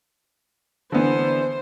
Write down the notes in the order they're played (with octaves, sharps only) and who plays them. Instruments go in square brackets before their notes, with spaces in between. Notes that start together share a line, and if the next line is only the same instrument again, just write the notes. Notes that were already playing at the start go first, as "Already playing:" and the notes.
[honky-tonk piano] D3 E3 B3 [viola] C5